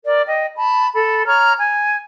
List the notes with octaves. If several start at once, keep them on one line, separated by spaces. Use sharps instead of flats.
A#4 D5
D#5 G5
A5 B5
A4 B5
C#5 A#5 F6
G#5